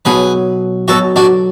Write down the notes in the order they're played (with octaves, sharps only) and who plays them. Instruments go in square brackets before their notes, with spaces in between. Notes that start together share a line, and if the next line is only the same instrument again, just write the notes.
[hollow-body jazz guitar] B1 B2 F#3 [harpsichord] G#4 B4
[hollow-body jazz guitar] B1 B2 F#3 [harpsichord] F#4 A4
[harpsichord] D4 F#4